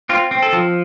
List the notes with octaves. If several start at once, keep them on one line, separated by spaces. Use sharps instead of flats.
C4 F4
C4
A4
F3